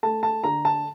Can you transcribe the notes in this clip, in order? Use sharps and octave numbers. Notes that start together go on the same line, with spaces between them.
A3 A5
A5
D3 A#5
A5